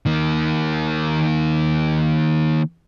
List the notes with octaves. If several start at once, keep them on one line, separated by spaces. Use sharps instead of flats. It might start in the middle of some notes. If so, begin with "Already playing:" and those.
D#3 A#3